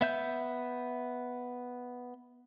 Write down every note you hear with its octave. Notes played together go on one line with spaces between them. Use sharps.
B3 E5 G6